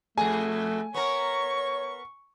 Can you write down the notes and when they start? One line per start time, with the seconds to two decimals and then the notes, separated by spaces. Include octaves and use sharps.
0.18 F2 B2 A3 G#4 G#5
0.94 B3 A#4 C#5 C#6